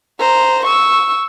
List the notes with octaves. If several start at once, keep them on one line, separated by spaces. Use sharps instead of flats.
C5 A#5
C#6 E6